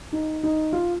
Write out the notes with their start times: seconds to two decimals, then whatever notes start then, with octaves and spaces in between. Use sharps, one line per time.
0.12 D#4
0.43 D#4
0.73 F4